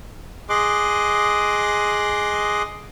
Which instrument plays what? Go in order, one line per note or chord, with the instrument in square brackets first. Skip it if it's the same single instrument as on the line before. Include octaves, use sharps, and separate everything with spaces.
[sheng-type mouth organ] G#4 D#5 C6 D6 F#6